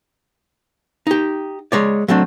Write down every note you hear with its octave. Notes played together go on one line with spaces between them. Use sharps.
D#4 G4
G#3 C#5 D5
F#3 A3 C4 D4